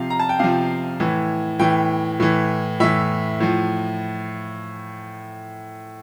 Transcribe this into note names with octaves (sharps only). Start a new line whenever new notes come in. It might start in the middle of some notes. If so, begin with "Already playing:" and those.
Already playing: C3 F3 F5
A#5
A5
G5
C3 F3 F5
A2 E3
A2 E3 G5
A2 E3
A2 E3 E5
A2 F3